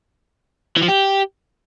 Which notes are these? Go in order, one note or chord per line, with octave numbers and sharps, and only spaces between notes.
E3
F3
G4